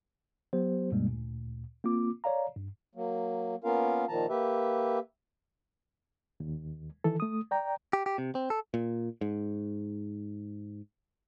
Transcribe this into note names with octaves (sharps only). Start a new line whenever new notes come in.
F#3 B3 G4 C5
D2 G2 B2 G3 G#3 A#3
D2 A#2
A#3 C4 F4 D6
C#5 D5 F5 A#5
G2
F#3 A#3
A#3 B3 C#4 F4 A#4 F5
A#2 D#3 F3 A5 A#5
A#3 G4 B4 E5
D#2
D#3 E3 A4
A3 D#6
D5 G5 A#5
G4
G4
C3
C4
A4
A#2
G#2